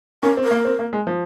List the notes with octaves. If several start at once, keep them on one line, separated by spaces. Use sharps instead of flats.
C#4 A#4
C4
A#4
A#3
C4
A#3
G#3
F3